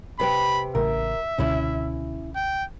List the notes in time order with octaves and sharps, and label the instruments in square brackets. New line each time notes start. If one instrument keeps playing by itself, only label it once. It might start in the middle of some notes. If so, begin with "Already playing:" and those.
[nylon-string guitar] C3 B4 G5 [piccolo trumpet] B5
[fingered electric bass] A1 A2 C#3 [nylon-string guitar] A#4 [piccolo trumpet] E5
[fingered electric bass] C#2 B2 D3 [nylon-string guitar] C#4 E4
[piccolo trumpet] G5